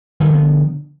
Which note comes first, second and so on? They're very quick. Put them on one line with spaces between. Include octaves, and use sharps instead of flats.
D#3 D3 F3 B3